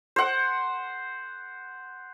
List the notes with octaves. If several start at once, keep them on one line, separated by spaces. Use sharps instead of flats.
C5 F#5